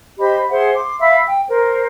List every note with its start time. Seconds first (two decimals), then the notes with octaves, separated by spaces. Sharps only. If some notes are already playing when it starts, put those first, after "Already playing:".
0.19 G4 C5 D#5 B5
0.50 G#4 C5 E5 F#5
0.74 C6 D6
1.00 E5 F5 B5 E6
1.25 G5
1.48 A#4 C5